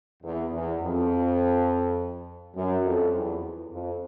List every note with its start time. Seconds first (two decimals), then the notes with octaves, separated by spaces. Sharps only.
0.23 E2
0.52 E2
0.81 F2
2.55 F#2
2.85 F2
3.14 E2
3.71 F2